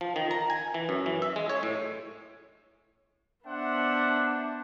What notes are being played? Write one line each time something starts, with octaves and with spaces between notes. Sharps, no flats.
F3
D#3
A#5
G#5
E3
F#2
E3
E5
G#3
C#5
A2
B3 D4 C5 E5 F#5